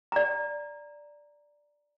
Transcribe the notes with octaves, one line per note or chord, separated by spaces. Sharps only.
D5 A#5